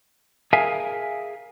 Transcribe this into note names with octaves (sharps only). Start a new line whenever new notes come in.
G#4 A#4 E5 F5 G#5